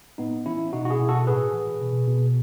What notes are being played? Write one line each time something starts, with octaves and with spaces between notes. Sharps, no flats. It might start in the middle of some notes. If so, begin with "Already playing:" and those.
A2 B3 D#4
E3 C#4 E4
B2 D#4 F#4
F#4
E4 G#4
B2
F#4 A4
A2 G#4 B4
E3
B2
B2